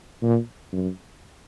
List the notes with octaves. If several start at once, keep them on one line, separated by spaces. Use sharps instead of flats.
A#2
F#2